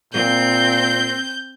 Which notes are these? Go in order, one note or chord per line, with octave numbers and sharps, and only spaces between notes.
A#2 C4 G6